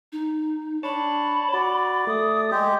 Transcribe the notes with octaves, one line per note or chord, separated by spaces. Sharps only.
D#4
D4 C#5 A5 B5
F#4 D5
A3 D#6
G#3 G4